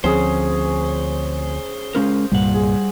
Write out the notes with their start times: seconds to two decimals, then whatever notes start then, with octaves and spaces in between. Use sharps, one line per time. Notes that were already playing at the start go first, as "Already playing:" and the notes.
0.04 D2 F3 C4 C#4 G#4 C5
1.95 G#3 C#4 A#4 C5 F5
2.32 C2 G2 A#2 G3 F#5
2.54 G#4